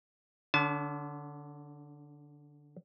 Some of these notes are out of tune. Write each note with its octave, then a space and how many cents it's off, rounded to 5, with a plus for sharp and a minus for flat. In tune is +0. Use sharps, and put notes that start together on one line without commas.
D3 +0 C#4 +45 A5 -35